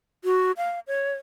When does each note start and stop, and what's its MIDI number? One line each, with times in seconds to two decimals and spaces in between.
0.24 0.52 66
0.57 0.80 77
0.87 1.15 73